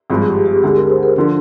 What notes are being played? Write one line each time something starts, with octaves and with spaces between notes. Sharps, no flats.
G#1 G2 F3 G#3 G#4
G4
G4
D2 D3 G#3 G#4
A#4
C5
A#4
D3 F3 D4